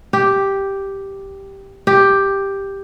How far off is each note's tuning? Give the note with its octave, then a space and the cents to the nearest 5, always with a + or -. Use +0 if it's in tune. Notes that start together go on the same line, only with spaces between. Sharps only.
G4 +0
G4 +5